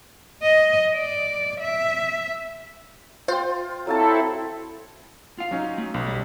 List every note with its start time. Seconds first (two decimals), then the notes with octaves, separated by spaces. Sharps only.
0.42 D#5
0.95 D5
1.60 E5
3.28 F4 C5 G5
3.87 F#3 C4 E4 A4 F5 A5
5.38 F4 F5
5.51 F#3 C#4 D#4
5.78 A3
5.94 B1
6.07 G3